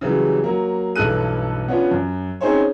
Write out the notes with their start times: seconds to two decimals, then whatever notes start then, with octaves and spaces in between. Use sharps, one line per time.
0.01 C#3 E3 F#3 G3
0.44 F#3 A#3
0.96 B1 G2 E3 A4 F#6 D#7
1.68 B3 C#4 D4 F4
1.91 F#2
2.41 C4 C#4 D#4 G#4 C5 C#5